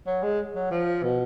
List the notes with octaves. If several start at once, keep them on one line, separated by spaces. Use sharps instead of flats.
F#3
G#3
F#3
F3
B2